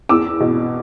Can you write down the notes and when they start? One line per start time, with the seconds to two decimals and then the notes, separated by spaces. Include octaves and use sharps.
0.09 E2 D6 E6
0.40 B2